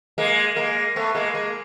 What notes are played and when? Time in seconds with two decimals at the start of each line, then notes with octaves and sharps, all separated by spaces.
0.18 G#3 A#3
0.56 G#3 A#3
0.96 A3 B3
1.15 G#3 A#3
1.34 G#3 A#3